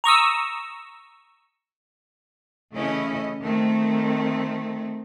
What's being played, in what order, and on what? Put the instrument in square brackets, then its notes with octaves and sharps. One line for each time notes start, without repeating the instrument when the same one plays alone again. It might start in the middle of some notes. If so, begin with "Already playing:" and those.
[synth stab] A#5 C#6 D#6 E6
[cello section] C#3 E3 A3 C#4 E4 D#5
D#3 A3 C4